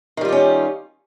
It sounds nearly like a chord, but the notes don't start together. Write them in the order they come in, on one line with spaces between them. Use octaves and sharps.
D#3 G3 F4 G4 C#4